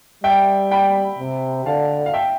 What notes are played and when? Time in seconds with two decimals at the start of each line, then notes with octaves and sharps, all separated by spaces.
0.24 G3 E5 G5
0.71 G5 B5
1.18 C3
1.66 D3 F5 A5
2.06 F5
2.14 E5 G5